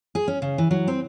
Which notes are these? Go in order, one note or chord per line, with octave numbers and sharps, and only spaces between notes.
G#4
C#4
C#3
E3
F#3
C4